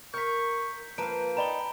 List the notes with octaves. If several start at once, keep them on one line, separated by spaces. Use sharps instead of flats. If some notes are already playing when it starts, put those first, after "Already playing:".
A#4 A#5 C#6 G6 B6
F3 A#3 B4 F5 A5 A#5 D7
D#4 D5 G5 A#5 B5 G7